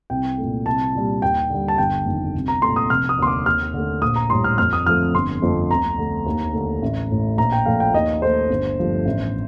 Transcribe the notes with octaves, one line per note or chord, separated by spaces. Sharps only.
C2 G5
A#2 A3
C2 A5
A#2 G3
D#2 G5
D3 G3
A5
G1 G5
F2 D#3
C2
A#5
A#2 A3 C6
D#6
F1 F6
D#6
D#2 D3 C6
D6
D#2 F6
D3 A3
A#1 D#6
A#5
A2 G3 C6
F6
F2 F6
D#6
D3 F3 A3 F6
G1 C6
F2 D3 F3 A3
D2 A#5
D3 A3
D#2
D3 A3
A1
A2 A3
A#1 A#5
G5
A#2 F3 A3 F5
G5
D#2 D#5
D#3 A3 C5
G1
G2 F3 A3
A1